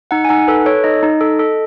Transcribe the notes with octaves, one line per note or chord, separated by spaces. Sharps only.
D#4 F#5
G#5
D#4 F#5
A4 B4
A4 C#5
D#4 D#5
D#4
A4
A4